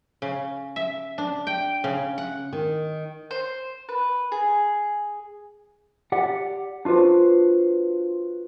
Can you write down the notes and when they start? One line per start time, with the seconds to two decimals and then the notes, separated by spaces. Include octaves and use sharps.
0.22 C#3
0.76 E5
1.18 D4
1.47 G5
1.84 C#3
2.18 F#5
2.53 D#3
3.31 C5
3.89 B4
4.32 G#4
6.12 G4 D5 F#5
6.85 D4 F4 F#4 B4 C5